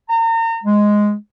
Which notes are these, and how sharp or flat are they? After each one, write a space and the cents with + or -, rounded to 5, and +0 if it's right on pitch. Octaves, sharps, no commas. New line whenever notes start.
A#5 -35
G#3 +0